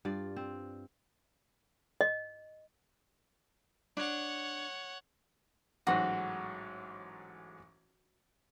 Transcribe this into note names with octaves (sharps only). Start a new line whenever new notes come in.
G2 F4 D5
C4
D#5
D4 C#5 F#5
A1 G#2 F#3 F#4